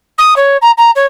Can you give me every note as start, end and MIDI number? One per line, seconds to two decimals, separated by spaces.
0.18 0.34 87
0.36 0.57 73
0.61 0.71 82
0.77 0.91 82
0.95 1.05 73